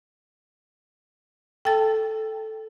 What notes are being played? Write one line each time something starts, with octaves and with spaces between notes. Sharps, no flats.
A4 G5 A5 A6